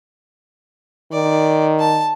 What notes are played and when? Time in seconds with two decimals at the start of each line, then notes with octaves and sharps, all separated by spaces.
1.12 D#3 D5
1.80 A5